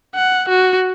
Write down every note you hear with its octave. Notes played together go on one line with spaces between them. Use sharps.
F#5
F#4